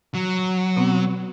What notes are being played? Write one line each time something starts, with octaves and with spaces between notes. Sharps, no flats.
F#3
B2 B3 C4